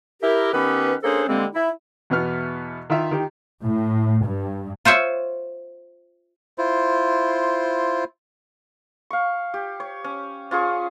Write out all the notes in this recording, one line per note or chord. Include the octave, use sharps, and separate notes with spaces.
E4 G4 A#4
D#3 B3 C#4 G4 B4
A#3 C#4 D4 G#4 A4 C5
D3 G3 G#3 A#3 C4
E4
E2 B2 B3 F6
D#3 F4 E5
D#3 G4
A2
G2
F4 C5 C#5 E5
E4 F4 C5
F5 C#6
G4
C#5
C#4
C#4 F4 G#4 C#6